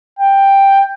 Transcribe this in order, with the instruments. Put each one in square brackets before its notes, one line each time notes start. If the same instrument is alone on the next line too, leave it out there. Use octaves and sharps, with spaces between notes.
[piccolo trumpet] G5